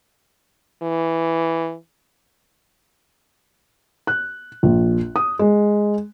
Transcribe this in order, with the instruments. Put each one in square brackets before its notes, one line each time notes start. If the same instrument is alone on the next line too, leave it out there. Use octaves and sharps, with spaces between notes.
[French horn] E3
[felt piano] F#6
A#1
D#6
G#3